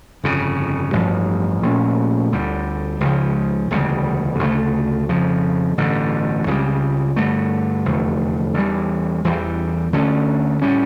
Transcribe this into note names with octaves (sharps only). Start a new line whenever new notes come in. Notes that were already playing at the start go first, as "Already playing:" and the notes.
G1 F2 C#3
A1 G2 F3
A#1 A#2 A3 C#4
D2 D3 G3
C#2 C#3 F3
E1 D2 C#3 G3
D2 C#3 F3 A3
F2 C#3 F3
A1 G2 D3
C#2 C#3 E3 G3
G2 D3 A3
F1 E2 D3 A3
E2 E3 G3
E2 E3 G3
D2 D3 A3 C#4
A2 G3 C#4